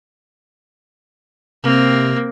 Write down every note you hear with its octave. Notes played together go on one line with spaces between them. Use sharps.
C3 A#3 C4